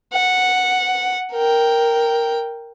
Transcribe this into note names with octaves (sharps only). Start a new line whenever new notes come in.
F#5
A#4 G5